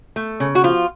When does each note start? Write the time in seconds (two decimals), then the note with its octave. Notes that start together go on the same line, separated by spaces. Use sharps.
0.16 A3
0.40 C#3
0.55 F#4
0.64 F3 F4